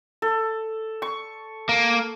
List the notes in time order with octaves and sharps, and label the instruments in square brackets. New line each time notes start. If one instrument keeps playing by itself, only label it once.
[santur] A4
C#6
[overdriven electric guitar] A#3